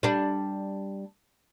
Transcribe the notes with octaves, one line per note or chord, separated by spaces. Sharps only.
G3 D4